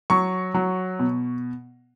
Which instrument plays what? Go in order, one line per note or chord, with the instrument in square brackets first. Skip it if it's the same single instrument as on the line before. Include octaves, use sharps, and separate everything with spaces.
[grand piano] F#3 C#6
F#3
B2